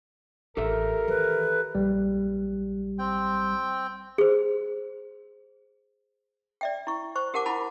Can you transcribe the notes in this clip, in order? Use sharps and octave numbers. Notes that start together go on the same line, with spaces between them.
A1 G4 A4 A#4 E5
D#3 E3 B4
A#1 G3
C4 G5
G#4 C5
D5 E5 G5
E4 C#6
C5 C#6
G4 A#4 F#5 A5 D6
E4 F4 F#5 A5 B5